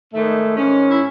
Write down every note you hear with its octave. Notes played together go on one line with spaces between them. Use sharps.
G#2 D#3 A3
G#2 D#3 C#4
E4